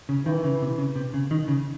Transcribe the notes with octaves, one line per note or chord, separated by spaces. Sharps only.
C#3
D#3 E3
C#3
C3
C#3
C3
C#3
D#3
C#3